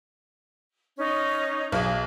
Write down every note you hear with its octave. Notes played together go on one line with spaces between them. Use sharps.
C#4 D#4
B1 G#4